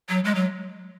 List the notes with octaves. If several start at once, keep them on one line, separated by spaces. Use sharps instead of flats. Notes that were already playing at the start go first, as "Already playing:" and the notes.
F#3
G#3
F#3